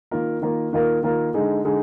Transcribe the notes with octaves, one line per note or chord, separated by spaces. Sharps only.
D#3 A#3 F4 A#4
D#3 A#3 F4 A#4
D#3 A#3 F4 A#4
D#3 A#3 F4 A#4
D3 G#3 D#4 G#4
D3 G#3 D#4 G#4